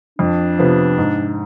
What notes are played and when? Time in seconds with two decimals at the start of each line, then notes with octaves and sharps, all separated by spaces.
0.19 F2 D4
0.59 C3 F3 B3
0.97 G#2